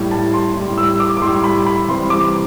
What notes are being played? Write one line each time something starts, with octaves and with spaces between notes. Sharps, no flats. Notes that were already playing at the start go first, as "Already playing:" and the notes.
Already playing: A2 G3
A5
C6
A2 G3
E6
D6
D6
A2 G3 C6
B5
B5
C3 E3 G3 C6
D6